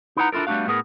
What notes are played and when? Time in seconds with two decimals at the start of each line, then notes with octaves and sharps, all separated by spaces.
0.17 D#4 E4 B4 C5 F#5 A#5
0.32 D4 E4 F4 A4 A#4
0.47 G3 A3 B3 D4 F#4 F5
0.67 A2 B3 G#4 A#4